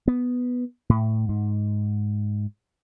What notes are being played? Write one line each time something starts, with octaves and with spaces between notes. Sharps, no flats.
B3
A2
G#2